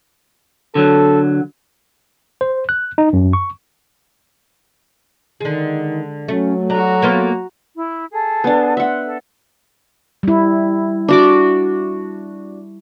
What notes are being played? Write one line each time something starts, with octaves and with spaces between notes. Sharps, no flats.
D3 F#3 A4
C5
F#6
D#4
F#2
C#6
D3 D#3 G#3
F#3 A3 C#4
D4 F#4 A4 A#5
A#3 B3 F4
E4
G#4 A4
B3 D4
E5 F#5 C6
A4
G3 E4
D4 F#4 D6